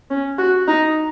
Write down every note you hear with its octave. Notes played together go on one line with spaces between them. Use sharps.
C#4
F#4
D#4